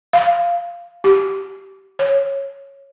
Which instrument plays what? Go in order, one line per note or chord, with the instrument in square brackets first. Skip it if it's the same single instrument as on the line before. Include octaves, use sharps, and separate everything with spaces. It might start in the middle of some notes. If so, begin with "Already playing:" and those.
[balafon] F5
G4
C#5